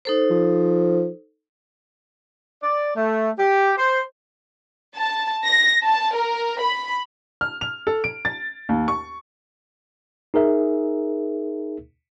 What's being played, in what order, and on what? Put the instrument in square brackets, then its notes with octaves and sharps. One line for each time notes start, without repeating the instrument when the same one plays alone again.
[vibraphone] D#4 A4 C5
[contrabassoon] F3
[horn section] D5
A3
G4
C5
[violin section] A5
A#6
A5
A#4
B5
[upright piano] F6
F7
A4
D7
A6
D#2
C#6
[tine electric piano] D#4 G#4 A#4 E5